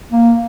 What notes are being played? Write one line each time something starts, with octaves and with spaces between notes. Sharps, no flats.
A#3